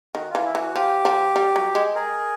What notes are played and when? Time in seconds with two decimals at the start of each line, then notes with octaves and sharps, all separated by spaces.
0.15 D#3 F#4
0.30 F4
0.35 E3
0.45 E4
0.55 E3
0.60 F#4
0.75 F3 G4
1.05 F3
1.36 G3
1.56 F#3
1.75 G#3
1.95 G#4 A#4